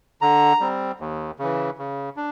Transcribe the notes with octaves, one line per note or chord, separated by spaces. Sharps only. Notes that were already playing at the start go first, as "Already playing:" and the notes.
D3 A#5
G3 C4
D#2
C#3 E3
C#3
D4